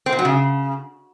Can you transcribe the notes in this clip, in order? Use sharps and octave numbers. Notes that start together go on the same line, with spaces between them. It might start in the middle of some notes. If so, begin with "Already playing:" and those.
C4
A#2
F#3
C#3